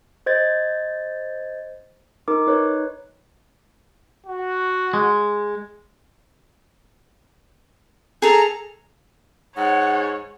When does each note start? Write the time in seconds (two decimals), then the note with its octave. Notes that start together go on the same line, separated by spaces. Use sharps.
0.26 C5 D#5 G#6 A6
2.28 D#4 A#4 D6
2.47 D#4 B4 C#5
4.26 F#4
4.94 G#3
8.22 G#4 A4 A#5
9.57 G#2 C#5 F#5